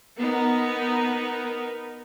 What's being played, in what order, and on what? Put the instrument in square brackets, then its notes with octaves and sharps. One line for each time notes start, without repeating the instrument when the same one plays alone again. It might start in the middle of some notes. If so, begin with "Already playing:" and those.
[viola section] B3 D#4 A#4